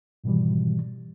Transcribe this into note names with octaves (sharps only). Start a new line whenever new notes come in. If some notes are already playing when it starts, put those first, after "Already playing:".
G#2 B2 D#3 E3 G3